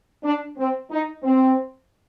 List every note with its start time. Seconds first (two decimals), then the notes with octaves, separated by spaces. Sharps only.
0.24 D4
0.57 C4
0.90 D#4
1.23 C4